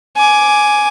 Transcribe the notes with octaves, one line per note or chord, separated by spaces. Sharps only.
G#5 D6